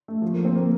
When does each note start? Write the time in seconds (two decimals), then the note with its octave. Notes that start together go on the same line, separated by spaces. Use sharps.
0.08 A3
0.22 F3
0.33 A#3
0.45 C4
0.56 A#3